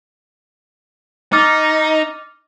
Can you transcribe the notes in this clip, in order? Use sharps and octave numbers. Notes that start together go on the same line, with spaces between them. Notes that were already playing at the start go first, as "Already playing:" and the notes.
D#4 D6 F6 A6